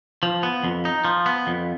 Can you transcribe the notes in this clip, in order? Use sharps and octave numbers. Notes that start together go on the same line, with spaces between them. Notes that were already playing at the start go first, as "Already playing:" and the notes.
F3
B3
F2
D#4
F3
B3
F2